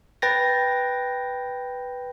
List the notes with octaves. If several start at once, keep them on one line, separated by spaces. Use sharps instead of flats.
B4 G5 A6 A#6